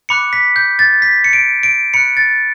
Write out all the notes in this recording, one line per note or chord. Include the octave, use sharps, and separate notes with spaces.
B5 D6 F#6 C#7
B6
G6
A6
B6
C#7
D7
D7
B5 F#6 C#7
A6